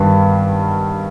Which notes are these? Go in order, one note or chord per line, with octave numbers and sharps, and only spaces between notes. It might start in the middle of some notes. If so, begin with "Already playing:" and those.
Already playing: G2 D#3 G3 B3